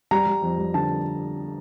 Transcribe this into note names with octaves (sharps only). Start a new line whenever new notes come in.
G3 A#5
G3
F2
G3
D3 A5